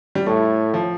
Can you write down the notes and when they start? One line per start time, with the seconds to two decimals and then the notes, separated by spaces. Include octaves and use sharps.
0.15 G3
0.26 A2 A3
0.74 F3